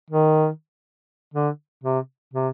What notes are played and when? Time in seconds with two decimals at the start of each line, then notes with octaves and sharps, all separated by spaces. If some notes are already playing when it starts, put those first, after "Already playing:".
0.11 D#3
1.34 D3
1.84 C3
2.34 C3